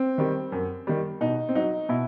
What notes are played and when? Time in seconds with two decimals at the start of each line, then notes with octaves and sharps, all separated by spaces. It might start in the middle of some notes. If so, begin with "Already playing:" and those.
Already playing: C4
0.18 D#3 G3
0.52 F#2
0.87 D#3 G3
1.21 B2 D#4
1.49 C4
1.55 F#3 D#4
1.89 B2 E4